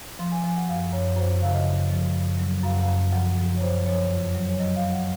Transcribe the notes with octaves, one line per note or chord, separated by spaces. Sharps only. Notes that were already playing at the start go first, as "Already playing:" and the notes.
F3 C6
G#5
F3 G#5
F#5
F#2 F5
F#2 C#5
F#2 C5
C#3 F5
D#5
F#2
F3
F#2
F#3
F#2 F5
F#5
F5
F#2
F3 F#5
F3
C#5
F#2 C5
F3 C#5
F2
F#3
C#5
F#3 D#5
F5
F#3
F#5